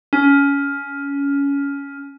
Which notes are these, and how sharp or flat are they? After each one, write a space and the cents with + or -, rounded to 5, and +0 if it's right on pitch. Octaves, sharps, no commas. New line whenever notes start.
C#4 +20